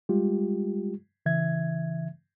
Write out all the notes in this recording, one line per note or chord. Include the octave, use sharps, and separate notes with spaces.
G3 G#3 F4 G4
C#3 E3 E5 G#6